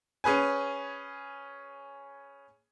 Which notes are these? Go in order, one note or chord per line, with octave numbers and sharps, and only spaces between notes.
C#4 G#4 B4 G#5